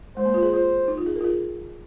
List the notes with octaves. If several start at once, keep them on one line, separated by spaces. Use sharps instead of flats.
G#3 C5
A#3
F4
G#4
F4 C5
D#4
F4
G#4
A#4
F4
G#4